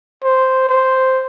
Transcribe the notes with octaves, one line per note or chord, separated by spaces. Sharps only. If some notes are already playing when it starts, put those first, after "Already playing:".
C5
C5